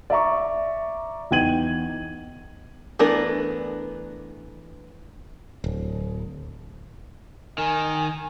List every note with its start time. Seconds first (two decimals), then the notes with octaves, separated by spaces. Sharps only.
0.10 D5 E5 A#5 C#6
1.31 E2 D#4 G5 G#6 D#7 F#7
2.99 E3 A3 B3 D4 A#4
5.64 D1
7.58 D#3 A#4 G#5